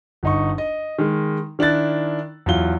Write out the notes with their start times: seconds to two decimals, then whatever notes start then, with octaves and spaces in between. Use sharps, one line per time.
0.23 G1 D#4 C#6
0.58 D#5
0.99 D#3 G#3
1.59 D#3 D4 E4 F#6 A6
2.46 E2 F#3 F4 G7